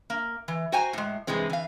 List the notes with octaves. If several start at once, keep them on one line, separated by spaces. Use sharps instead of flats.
A#3
E3
F#4 C5 G5 G#5 A#5
A2 G#3
G2 C3 E3 G#3 C4
E3 F5